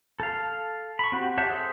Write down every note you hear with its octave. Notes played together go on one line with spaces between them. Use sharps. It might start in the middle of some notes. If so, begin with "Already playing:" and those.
A4 F5
B5 C#6
C4 F#4 G4
G4 C#5 E5 F#5 A5
G#4 A4 C5 E5